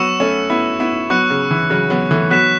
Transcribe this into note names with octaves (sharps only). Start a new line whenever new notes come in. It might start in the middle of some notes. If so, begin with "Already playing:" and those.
Already playing: F#3 B3 C#6 E6 C#7 E7
A3 C#4
B3 E4
B3 E4
F#3 B3 C#6 F#6 C#7
C#3
E3
C#3 F#3
F#3 B3
E3 A3
F#3 B3 F#6 B6 E7